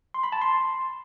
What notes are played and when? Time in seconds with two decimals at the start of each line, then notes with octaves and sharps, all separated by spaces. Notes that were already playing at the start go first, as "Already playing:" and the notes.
0.14 C6
0.23 B5
0.32 A5
0.41 C6